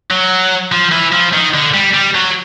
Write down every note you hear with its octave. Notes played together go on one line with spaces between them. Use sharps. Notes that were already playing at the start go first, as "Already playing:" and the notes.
F#3
F3
E3
F3
D#3
D3
G3
G3
F#3